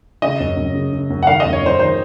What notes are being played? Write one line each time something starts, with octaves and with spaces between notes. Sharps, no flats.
C#3 D#5
F#2
F#2
C#3
C#3
F#2
F#5
D#3 F5
D#5
F#2
C#5
F#2 C5
D#3 C5